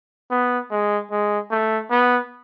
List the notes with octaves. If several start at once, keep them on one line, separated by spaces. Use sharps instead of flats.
B3
G#3
G#3
A3
B3